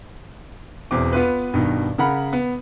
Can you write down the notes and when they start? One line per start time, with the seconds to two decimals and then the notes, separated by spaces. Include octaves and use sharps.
0.91 E1 E2 C4 D6
1.13 B3 F4 B4
1.54 G2 B2 D#3
1.98 C#3 A#4 F#5 B5
2.33 B3